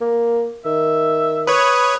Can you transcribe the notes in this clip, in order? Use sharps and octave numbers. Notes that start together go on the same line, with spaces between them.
A#3
D#3 E5
B4 C#5 D#6